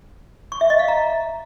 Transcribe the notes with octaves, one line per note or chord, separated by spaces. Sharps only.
C#6
E5
D#5
F5
A#5